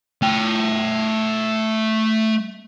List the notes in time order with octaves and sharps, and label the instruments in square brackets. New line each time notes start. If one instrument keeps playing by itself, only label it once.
[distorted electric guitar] A3 G5